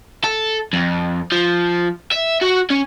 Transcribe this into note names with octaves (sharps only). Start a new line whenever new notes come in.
A4
F2
F3
E5
F#4
C#4